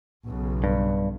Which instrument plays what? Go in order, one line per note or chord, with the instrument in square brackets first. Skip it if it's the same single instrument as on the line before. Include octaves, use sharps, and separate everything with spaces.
[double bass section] B1 C#3
[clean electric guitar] G2